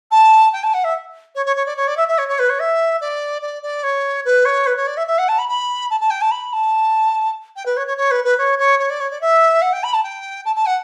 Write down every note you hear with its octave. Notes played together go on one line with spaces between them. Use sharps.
A5
G5
A5
F#5
E5
C#5
C#5
C#5
D5
C#5
D5
E5
E5
C#5
C#5
B4
C#5
E5
D5
D5
D5
C#5
B4
C#5
B4
C#5
D5
E5
E5
F#5
A5
B5
B5
A5
A5
G5
A5
B5
A5
G5
B4
C#5
C#5
C#5
B4
B4
C#5
C#5
C#5
D5
C#5
D5
E5
F#5
G5
B5
A5
G5
A5
A5
F#5